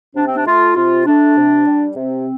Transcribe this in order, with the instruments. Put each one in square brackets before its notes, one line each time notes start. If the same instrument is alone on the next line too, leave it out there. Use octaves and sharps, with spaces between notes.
[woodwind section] C3 D4
C4
D4
A3 F4
C3 F4
A3 D4
C3
G3
C3 C4